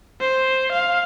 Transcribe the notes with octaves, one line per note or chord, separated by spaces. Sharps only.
C5
F5